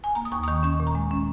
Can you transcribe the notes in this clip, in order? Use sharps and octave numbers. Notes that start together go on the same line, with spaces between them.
G#5
A#3 A#5
D#6
D#2 C#6
D#6
D#3 C#6
C#4 C#6
A#2
A#5
G#3
C#4